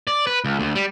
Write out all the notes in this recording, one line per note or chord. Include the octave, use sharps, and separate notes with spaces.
D5
B4
C#2
D2
G3